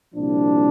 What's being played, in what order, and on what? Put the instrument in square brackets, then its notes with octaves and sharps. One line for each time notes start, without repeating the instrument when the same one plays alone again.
[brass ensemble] C2 A#2 F3 D4